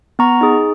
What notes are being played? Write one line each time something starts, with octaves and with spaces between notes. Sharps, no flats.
B3 A#5 C#6
D#4 G#4